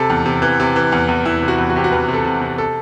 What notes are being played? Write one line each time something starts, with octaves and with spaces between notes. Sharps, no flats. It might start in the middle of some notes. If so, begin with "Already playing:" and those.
Already playing: C3 A4
E2
C3
E3
C3
E3
E2
E2
E2 E4
C3
F#4
E2
F#4
C3 G4
F#4
E2 B4
C3
A4
C3
C3
A4